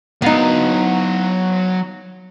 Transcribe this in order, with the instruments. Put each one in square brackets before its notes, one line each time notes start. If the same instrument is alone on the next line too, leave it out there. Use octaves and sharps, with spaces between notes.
[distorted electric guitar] F#3 F5 [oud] B3 D#4